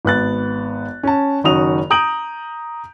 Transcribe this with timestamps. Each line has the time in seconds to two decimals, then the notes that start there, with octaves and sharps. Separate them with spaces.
0.05 G#1 B3 F#6 A6
1.03 C#4 A5
1.44 F#1 D#3 C#4 F#4 D#6 F7
1.90 A#5 D#6 G6 D7 F#7